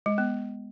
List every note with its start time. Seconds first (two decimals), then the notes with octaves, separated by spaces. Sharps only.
0.06 G#3
0.18 B3